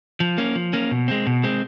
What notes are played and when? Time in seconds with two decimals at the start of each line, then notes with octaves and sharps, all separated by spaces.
0.20 F3
0.38 A#3 C#4
0.55 F3
0.73 A#3 C#4
0.91 B2
1.08 G#3 C4
1.27 B2
1.43 G#3 C4